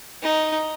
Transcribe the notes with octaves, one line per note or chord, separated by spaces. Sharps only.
D#4